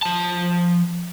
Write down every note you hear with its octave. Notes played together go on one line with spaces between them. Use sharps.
F3 A5